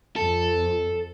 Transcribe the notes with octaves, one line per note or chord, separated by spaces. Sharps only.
F2 A4